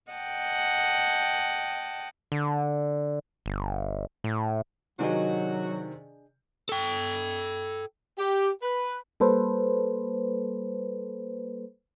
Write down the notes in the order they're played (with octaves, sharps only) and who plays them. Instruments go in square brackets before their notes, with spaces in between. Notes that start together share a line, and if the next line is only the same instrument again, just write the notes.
[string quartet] D#5 F#5 G5 A5
[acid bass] D3
G1
A2
[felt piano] C3 D#3 [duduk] F#3 [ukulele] D4 G#4 D#5 [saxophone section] F#4
[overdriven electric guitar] A4 G5
[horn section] G4
B4
[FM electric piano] G3 A#3 A4 B4 C5